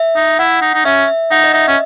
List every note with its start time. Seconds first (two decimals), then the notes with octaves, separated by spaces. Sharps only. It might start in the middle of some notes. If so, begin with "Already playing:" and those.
Already playing: E5
0.16 D#4
0.39 E4 F#5
0.62 D#4
0.74 D#4
0.85 C#4 E5
1.08 E5
1.31 D#4 F#5
1.44 D#5
1.54 D#4 E5
1.68 C#4